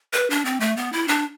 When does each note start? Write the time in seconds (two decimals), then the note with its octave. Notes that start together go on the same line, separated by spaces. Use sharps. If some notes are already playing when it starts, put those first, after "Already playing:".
0.13 B4
0.30 D4
0.45 C4
0.60 A3
0.77 B3
0.92 E4
1.08 D4